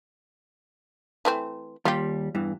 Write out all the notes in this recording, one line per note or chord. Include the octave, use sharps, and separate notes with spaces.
E3 A3 C4
D#2 G3 F4 G4 C6
E2 G2 E3